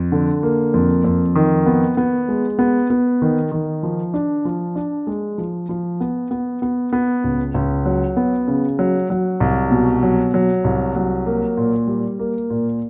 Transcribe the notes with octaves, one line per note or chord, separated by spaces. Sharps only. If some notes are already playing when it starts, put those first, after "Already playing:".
Already playing: F2
D3
A#3
F2
F2
D#3
B3
B3
G#3
B3
B3
D#3
D#3
F3
D4
F3
D4
G#3
F3
F3
B3
B3
B3
B3
C#2
C#2
F#3
B3
C#3
F#3
F#3
C2
B2
F#3
F#3
C2
F#3
A#3
A#2
G3
A#3
A#2